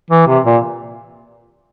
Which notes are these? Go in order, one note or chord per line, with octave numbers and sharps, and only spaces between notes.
E3
C3
A#2